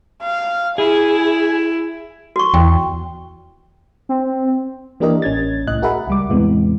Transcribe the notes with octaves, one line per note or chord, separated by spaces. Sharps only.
F5
E4 G#4
F#4 C#6
E2 G5
C4
E3 A#3 D4 G4 A#4 D#5
A1 C#4 G#6 A6
C2 A2 D#5 F#6
F#4 G#4 A#4 E5 F#5 B5
C#2 G3 D6
E2 A2 C3 E3 G#3 B3